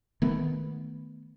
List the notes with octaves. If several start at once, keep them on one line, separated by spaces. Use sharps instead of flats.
D#3 A3 B3